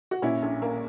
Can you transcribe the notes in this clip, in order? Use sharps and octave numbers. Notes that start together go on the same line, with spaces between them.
F#4
A#2 C#4 E4
A#1
A#3